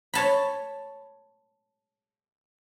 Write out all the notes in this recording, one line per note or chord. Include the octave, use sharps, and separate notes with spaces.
C#5 A5 B5